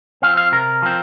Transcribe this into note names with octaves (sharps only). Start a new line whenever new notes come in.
F3 C4 F5
F5
C3 A#4
F3 C4